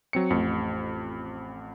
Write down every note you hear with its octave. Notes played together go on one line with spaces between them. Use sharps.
F#3 C4 C#7
A1 F2